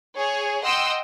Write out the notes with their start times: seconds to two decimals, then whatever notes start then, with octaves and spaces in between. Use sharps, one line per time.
0.17 G#4 C#5
0.63 D#5 F#5 G5 C6 D#6 E6